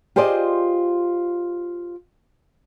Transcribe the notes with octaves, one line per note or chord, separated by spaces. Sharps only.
F4 G4 G#4 C5 D5 D#5